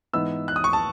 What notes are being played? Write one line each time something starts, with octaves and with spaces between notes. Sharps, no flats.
G#2 E3 B3 D#4 E6
F#6
D#6
C#6
A5